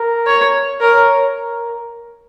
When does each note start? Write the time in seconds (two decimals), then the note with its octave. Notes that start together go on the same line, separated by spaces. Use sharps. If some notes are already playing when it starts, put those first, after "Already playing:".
Already playing: A#4
0.27 C#5
0.81 A#4 C#5
1.36 A#4